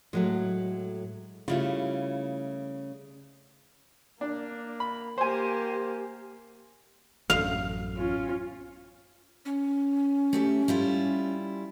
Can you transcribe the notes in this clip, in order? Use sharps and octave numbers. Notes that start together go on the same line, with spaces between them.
A2 F#3 G#3 A3
C#3 G3 A3 E4 F4
A#3 D4
B5
A#3 G4 C5 G#5
A1 F#2 F5
C#4 F4
C#4
A3 G4 E5
G3 E4 F4